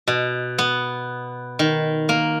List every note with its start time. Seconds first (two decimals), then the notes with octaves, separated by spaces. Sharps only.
0.08 B2
0.58 B3
1.59 D#3
2.09 A#3